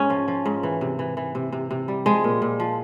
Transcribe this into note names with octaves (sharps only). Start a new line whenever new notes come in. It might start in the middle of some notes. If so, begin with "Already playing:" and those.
Already playing: G#2 C#4
F3
F3
G#2
E3
C3
E3
E3
C3
C3
C3
G3
F3 G#3
A#2
A#2
F3